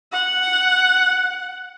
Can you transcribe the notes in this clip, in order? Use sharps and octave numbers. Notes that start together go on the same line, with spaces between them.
F#5